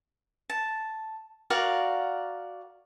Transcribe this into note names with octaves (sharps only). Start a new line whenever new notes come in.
A5
F#4 A#4 D5 F5